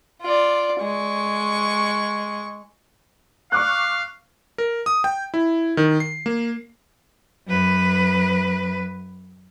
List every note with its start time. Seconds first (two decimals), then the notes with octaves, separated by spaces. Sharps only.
0.22 F4 D5
0.81 G#3 C#6
3.52 F5 C#6 D6 F#6
4.58 A#4
4.86 D#6
5.04 G5
5.34 E4
5.77 D#3
6.00 C7
6.26 A#3
7.48 F#2 B4